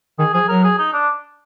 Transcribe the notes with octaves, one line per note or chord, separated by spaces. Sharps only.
D#3 G#4
F3 G#4
F#3 A#4
G#4
D#4
D4